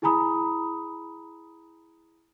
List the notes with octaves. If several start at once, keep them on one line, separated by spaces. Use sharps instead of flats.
E4 G#4 G#5 A#5 B5 D#6